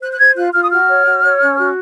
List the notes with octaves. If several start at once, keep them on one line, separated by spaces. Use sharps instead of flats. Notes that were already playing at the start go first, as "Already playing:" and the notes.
C5 F#6
F#6
C5 G#6
F4 F#6
F4 F6
D#6
F#4 F6
C#5
F#4
C#5
C#4
F#4